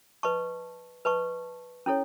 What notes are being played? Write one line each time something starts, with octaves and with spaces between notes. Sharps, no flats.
B4 D#5 A5 C#6
B4 D#5 A5 C#6
C#4 E4 A4 C#5